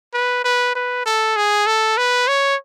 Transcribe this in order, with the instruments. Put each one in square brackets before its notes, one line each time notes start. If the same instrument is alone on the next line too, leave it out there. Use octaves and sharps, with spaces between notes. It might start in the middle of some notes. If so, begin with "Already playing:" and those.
[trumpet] B4
B4
B4
A4
G#4
A4
B4
C#5